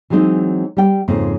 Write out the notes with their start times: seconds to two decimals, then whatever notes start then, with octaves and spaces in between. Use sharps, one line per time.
0.10 E3 F#3 G#3 C4 D#4
0.77 G3 G5
1.08 F2 G#2 C#3 F3 A#3 C4